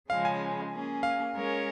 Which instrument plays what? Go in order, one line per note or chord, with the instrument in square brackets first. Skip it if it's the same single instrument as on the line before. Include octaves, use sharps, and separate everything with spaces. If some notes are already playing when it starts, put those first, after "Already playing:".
[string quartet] C#3 F3 G#3 C#4 [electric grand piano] F5
[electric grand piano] G#5
[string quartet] A#3 C#4 G#4
[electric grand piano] F5
[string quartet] G#3 C#4 A#4 C#5